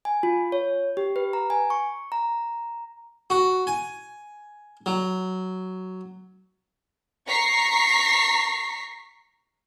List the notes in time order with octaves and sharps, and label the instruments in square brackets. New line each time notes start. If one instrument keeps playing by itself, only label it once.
[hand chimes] G#5
F4
C#5
G4
B4
A#5
G#5
C#6
A#5
[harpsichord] F#4
G#5
F#3
[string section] A#5 C#6 B6 C7